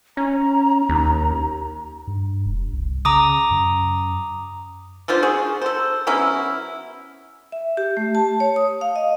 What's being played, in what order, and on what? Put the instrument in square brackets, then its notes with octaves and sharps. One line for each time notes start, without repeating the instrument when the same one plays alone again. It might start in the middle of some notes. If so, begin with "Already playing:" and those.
[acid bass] C#4 [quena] A#5
[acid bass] D#2
[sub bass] G2
E1
C2
[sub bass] C#3 [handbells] A#5 D6 D#6
[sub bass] F#2
[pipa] D3 F3 F4 C5
F#4 G#4
A4 C5
F#3 B3 C#4 E4
[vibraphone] E5
G4
A3
A5
C#5
D#6
F5
D#5